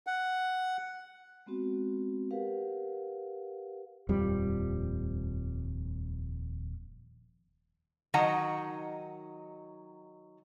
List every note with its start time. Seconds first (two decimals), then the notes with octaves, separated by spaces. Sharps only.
0.07 F#5
1.46 G#3 B3 C4 F#4
2.31 G4 A#4 B4 F5 F#5
4.09 D#1 F2 F3 G3
8.14 D#3 F#3 D#4 D#5 F#5 A#5